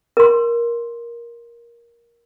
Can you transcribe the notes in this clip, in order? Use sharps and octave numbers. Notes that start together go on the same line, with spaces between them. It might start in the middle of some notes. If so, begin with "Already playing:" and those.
A#4 C6